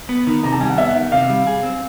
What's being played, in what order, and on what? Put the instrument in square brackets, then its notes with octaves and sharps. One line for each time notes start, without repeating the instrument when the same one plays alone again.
[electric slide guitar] B3
D#3
[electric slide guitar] C3 [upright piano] A#5
[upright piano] A5
[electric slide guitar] G3 [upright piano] G#5
[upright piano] F#5
[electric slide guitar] B3 [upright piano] E5
[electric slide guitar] D#3
[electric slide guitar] C3 [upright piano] F5
[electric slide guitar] G3
G#4
C4